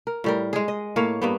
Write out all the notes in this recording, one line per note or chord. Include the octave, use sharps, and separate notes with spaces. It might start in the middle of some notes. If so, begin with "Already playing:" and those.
A#4
A2 G3 A#4
G#3 G#4
D#5
A2 A#3 C#5 F5
G2 A#3 B3